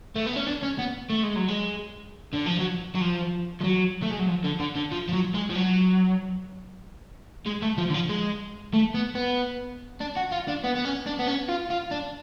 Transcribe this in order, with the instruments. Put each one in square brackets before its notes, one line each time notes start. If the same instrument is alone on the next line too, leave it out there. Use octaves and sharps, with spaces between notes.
[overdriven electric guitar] A3
B3
C#4
D4
C#4
B3
A3
G#3
F#3
G#3
D3
F3
F#3
F#3
F3
F3
F#3
A3
G#3
F#3
F3
D3
D3
D3
F3
F3
F#3
G#3
F3
F#3
G#3
A3
F3
D3
F3
G#3
A3
B3
B3
D4
F#4
F4
D4
B3
B3
C#4
D4
B3
C#4
F4
F4
D4